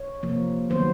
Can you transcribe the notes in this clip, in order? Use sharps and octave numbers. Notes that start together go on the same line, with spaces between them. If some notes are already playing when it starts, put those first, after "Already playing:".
Already playing: C#5
C3 F3 A#3
D#3 F#3 B3 C5